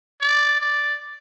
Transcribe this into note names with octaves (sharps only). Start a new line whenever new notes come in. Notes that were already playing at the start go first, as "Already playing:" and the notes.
D5
D5